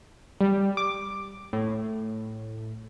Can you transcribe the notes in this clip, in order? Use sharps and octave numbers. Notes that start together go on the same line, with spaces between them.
G3
D6
A2